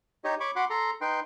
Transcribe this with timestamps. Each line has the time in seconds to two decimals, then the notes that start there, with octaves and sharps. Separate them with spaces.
0.24 D#4 G4 C#5 D#5
0.40 C#5 B5 C#6 D6
0.56 F#4 F#5 B5 C6 D6
0.70 A4 A#5 C6
1.01 D#4 B4 G5 C6